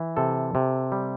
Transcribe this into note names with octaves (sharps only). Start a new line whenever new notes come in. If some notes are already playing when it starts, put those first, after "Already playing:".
Already playing: E3
C3 A4
C3
G3